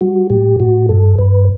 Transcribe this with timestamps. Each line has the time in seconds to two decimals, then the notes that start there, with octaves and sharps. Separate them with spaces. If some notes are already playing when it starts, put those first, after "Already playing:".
0.01 G3 F#4
0.30 A2 G4
0.60 A2 F#4
0.89 G2 A4
1.18 G2 B4